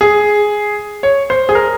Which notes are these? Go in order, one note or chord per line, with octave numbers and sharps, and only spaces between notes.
G#4
C#5
C5
G#4
A#4